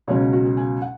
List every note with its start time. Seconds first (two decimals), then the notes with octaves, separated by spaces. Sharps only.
0.08 C#2 B2 F#3 C#4 C#5
0.33 F#4
0.45 G#4
0.57 G#5
0.82 F#5